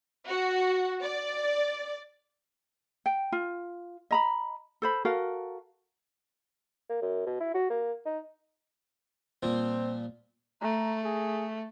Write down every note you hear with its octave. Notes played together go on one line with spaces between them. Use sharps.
F#4
D5
G5
F4
D#5 A#5 B5
A4 C5 B5
F#4 A4 A#4 F5
A#3
F#2
B2
E4
F#4
A#3
D#4
A#2 F3 G3 C4
A3 A#5
G#4